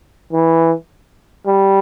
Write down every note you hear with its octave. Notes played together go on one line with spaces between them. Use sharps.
E3
G3